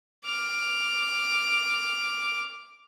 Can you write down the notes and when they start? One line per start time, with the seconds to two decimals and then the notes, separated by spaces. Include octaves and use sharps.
0.25 D6 F6